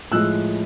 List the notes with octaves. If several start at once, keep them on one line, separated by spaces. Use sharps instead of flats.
A2 F3 G#3 E6 F#6